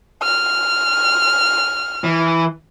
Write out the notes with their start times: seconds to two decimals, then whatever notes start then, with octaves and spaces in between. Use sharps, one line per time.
0.23 F6
2.04 E3